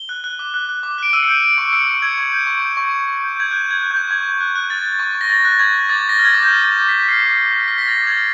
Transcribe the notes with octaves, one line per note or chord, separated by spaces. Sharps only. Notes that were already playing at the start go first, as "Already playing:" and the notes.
Already playing: G7
F#6
F#6
D6
F#6
F#6
D6
F#6 D7
E6 D#7
C#7
G6 D7
G6 D7
C#6 D7
E6 C#7
E6 C#7
C#6 G#6
C#6 G#6
G6
C#6
G6
C#6
C#6
C#6
G6
G6 G#6
F#6 G6
F#6 G#6
F#6
G6
C#6
C#6 G#6
C#6
F#6
F#6
F#6 A6
F#6
C#6
C#6
A#6
C#6 A6
F#6
C#6 G#6
C#6
D6 A6
D6 A#6
F6
G#6
D6 A6
G6
F6 G#6
D6 A6
D6
F6 B6
F6 C7
D6
D6
F6
F6 B6
A#6
F6
A6
D6
G#6
F6